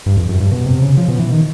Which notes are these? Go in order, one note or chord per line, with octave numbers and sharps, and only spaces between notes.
G2
F2
F#2
G2
B2
C3
C#3
F3
B2
E3
D#3